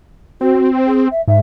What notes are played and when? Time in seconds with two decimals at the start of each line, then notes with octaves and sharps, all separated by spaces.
0.41 C4 F#4
0.86 G#4
1.11 E5
1.28 G#2 E5